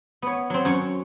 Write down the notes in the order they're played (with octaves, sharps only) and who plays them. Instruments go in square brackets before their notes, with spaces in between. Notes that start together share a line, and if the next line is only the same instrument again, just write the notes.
[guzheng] B3 C#5
F#3 C4
F#2 C#5